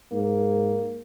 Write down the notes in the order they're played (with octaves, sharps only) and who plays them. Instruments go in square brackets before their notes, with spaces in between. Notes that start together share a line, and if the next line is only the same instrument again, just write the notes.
[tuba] G#2 [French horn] A#3